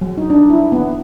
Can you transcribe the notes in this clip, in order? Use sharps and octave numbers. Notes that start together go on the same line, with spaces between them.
F#3
D#4
D4
E4
B3